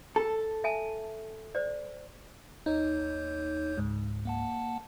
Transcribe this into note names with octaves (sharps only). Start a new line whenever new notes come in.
A4
E5 G#5 A5
C5 D5
D#2 D#4 C#5 G6
C#2 G#2
A#3 F#5 A5